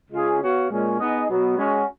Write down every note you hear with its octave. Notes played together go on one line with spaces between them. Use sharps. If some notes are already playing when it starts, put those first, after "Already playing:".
C#3 G#3 C#4 F4 G#4
B3 F#4 C#5 F5
A#2 G#3 C#4
B3 D#4 G#4 D#5
B2 F#3 B3
G#3 C#4 F#4